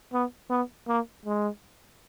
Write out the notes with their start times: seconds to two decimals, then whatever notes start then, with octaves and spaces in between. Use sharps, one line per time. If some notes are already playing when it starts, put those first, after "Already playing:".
0.13 B3
0.50 B3
0.88 A#3
1.26 G#3